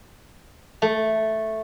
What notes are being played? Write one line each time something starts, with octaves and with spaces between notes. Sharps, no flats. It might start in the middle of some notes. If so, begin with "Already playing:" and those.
A3